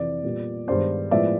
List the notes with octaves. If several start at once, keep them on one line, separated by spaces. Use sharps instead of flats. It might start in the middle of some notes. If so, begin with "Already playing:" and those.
Already playing: F2 C3 E3 D5
A#2 G3 B3
G2 D#3 G#3 B3 C5 D5
A2 F3 G#3 B3 D5 E5